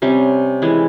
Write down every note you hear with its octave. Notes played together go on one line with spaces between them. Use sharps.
C3 G3 C#4
E3 G#3 E4